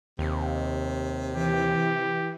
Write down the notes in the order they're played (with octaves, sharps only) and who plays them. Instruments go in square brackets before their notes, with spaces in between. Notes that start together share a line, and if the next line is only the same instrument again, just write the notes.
[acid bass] D#2 [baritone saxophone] C3
[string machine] E3 [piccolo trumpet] G4